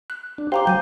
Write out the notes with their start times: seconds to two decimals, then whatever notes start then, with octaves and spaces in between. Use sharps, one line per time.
0.10 F#6
0.38 D4
0.52 G4 C5 F5 G5 A#5 D6
0.67 F#3 G#5 G6